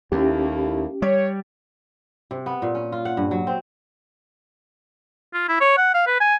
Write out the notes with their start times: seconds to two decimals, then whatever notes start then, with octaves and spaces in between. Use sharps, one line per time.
0.12 D#2 A3 A#3 C#4 E4 G4
1.02 G3 C#5
2.31 C3
2.46 B3
2.62 A#2
2.75 C#4
2.92 F4
3.05 F#5
3.17 G2
3.31 F#3
3.47 C4
5.34 F4
5.49 E4
5.61 C#5
5.78 F#5
5.94 F5
6.07 B4
6.20 G#5